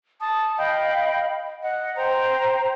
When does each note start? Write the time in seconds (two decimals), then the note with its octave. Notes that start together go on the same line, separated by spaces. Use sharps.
0.21 A5 D#6
0.58 D#5 F5 G5 B5
1.63 D#5 F#5
1.96 C5 G5 A#5